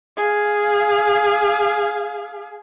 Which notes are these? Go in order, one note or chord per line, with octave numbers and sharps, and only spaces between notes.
G#4 F5